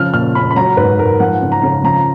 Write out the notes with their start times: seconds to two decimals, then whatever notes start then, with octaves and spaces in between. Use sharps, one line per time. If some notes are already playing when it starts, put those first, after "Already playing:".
Already playing: C#3 F3 F6
0.14 A#2 F6
0.35 C#4 B5
0.51 B5
0.56 F#3 A#5
0.77 G#2 B4
0.99 G#2 A#4
1.20 F3 F#5
1.42 C#3
1.52 A#5
1.63 C#3
1.84 F3 A#5